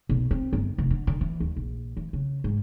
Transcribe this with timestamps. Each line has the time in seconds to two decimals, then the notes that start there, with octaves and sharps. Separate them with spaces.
0.09 B1
0.31 C4
0.53 G1
0.78 F1
0.91 D3
1.07 D3
1.21 E3
1.40 D#2
1.56 A#1
1.97 E3
2.13 C#3
2.44 G#2